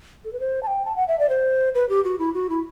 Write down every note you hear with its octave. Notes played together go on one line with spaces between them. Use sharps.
A4
B4
C5
A5
G5
A5
F#5
E5
D5
C5
B4
G4
F#4
E4
F#4
E4